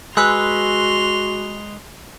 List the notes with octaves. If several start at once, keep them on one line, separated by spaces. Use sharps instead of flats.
G#3 F#4 B4 G#5 C6 E6 F#6 F7